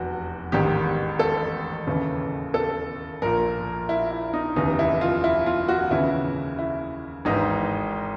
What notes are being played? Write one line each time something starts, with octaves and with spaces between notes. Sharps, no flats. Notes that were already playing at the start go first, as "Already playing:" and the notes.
Already playing: F1 E2 F#4
A1 G#2 D#3 G4
A4
D#2 C#3 E3
A4
A#1 A#2 A#4
E4
E4
D#4
F1 D#2 C#3 E3 D#4
E4
F4
E4
F4
F#4
D#2 C#3 E3 E4
E4
G#1 G#2 E3 D#4